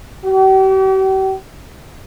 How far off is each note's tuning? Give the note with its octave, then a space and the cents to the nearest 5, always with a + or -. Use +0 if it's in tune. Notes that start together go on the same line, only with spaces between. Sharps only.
G4 -45